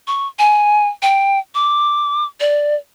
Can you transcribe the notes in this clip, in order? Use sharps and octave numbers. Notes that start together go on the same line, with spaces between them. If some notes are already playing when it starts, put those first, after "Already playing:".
C#6
G#5
G5
D6
D5